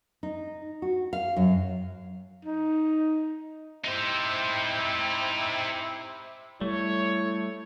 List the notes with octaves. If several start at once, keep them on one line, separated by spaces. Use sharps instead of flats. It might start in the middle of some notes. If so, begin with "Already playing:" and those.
D#4
F#4
F5
F#2
D#4
C3 C4 D#4 E4 C5
G3 A3 E4 C#5